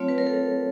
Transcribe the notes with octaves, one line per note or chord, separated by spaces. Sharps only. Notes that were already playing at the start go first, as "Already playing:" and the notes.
Already playing: F#3 A3 C4 F4 C#5
B4
A#4
A4